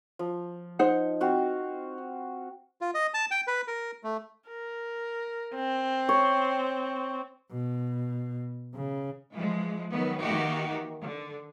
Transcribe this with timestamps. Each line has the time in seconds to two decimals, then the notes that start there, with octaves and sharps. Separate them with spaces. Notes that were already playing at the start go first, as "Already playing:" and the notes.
0.19 F3
0.79 D#4 C5 F#5
1.21 C4 F#4 F5
2.81 F4
2.94 D#5
3.14 A5
3.31 G5
3.47 B4
3.67 A#4
4.03 A3
4.49 A#4
5.55 C4
6.09 C#5
7.52 B2
8.75 C#3
9.32 E3 F3 G#3
9.90 D#3 F#3 B3
10.21 D#3 E3 A#3 D#4 F#4 G4
11.01 D3